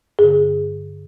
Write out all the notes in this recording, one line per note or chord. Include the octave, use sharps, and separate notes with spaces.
G2 D3 G#4